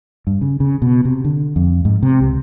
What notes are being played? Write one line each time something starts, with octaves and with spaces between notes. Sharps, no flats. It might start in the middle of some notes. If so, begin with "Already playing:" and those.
G2
C#3
C#3
B2
C3
D3
F2
G#2
C3
C#2